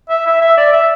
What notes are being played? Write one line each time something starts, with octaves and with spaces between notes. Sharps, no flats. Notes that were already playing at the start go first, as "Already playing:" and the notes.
E5
E5
E5
D5
E5